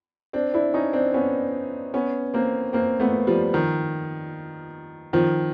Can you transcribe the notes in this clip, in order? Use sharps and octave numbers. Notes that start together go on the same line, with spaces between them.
C4 D4
D4 E4
C#4 D#4
C4 D4
B3 C#4
B3 C#4
A#3 C4
A#3 C4
A3 B3
F3 G3
D#3 F3
D#3 F3